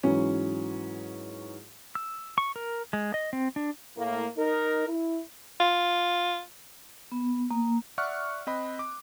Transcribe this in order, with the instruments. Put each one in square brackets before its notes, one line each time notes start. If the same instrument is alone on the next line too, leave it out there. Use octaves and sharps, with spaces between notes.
[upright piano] G#2 E3 F#3 C#4
[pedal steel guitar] E6
C#6
A#4
G#3
D#5
C4
D4
[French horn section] A2 A#3
D#4 A#4
E4
[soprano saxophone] F4
[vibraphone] B3
A#3
[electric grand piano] D5 E5 F#5 C#6 F6 F#6
C4 D#5 B5
D6